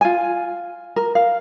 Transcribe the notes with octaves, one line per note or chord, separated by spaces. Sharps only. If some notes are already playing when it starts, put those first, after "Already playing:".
F4 G#5
A#4
F5